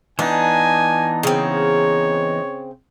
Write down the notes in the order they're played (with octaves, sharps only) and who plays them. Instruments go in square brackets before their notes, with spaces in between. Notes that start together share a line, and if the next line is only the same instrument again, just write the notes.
[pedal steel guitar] E3 B3 D#4 [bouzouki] D4 [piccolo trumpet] G#5
[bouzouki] C#3 C4 [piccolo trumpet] C#5